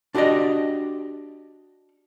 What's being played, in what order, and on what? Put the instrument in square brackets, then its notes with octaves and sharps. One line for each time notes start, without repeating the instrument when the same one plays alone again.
[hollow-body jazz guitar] D4 F#4 G4 D5 D#5